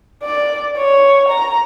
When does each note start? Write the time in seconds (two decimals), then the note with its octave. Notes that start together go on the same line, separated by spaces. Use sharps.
0.24 D5
0.78 C#5
1.29 A#5